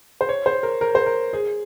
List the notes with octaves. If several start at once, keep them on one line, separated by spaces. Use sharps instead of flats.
C5
C#5
C5
A#4
A#4
C5
A#4
G#4